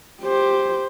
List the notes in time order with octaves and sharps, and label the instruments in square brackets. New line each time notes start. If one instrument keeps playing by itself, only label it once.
[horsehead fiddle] G4 C5